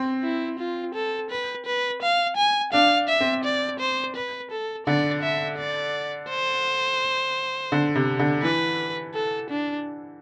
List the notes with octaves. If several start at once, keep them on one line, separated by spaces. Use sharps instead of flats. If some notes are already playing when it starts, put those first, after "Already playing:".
Already playing: C4
E4
F4
A4
B4
B4
F5
G#5
D4 F5
E5
C4
D5
C5
B4
A4
D3 D5
E5
D5
C5
D3
C3
D3
E3 B4
A4
D4